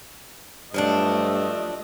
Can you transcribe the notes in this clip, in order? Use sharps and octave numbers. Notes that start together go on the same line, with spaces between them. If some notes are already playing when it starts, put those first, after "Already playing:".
G2 F3 F#3 A3 D4 D#5